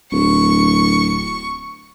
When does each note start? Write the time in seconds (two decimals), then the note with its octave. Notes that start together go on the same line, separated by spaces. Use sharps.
0.12 D1 C#6